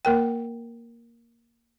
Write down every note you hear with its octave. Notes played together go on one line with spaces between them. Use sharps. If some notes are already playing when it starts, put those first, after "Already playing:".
A#3 A#4 G5